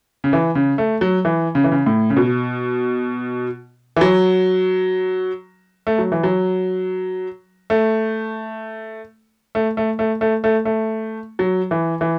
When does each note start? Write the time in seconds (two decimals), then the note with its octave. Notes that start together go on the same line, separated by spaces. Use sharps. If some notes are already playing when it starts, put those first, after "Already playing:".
0.24 C#3
0.33 E3
0.55 C#3
0.78 A3
1.01 F#3
1.25 E3
1.55 C#3
1.64 E3
1.71 C#3
1.86 A2
2.10 C#3
2.16 B2
3.96 E3
4.01 F#3
5.87 A3
5.99 F#3
6.12 E3
6.24 F#3
7.70 A3
9.55 A3
9.77 A3
9.99 A3
10.21 A3
10.44 A3
10.65 A3
11.39 F#3
11.71 E3
12.01 E3